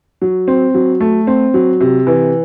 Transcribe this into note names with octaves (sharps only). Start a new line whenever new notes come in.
F#3
C4
F#3
A3
C4
F#3
C3
E3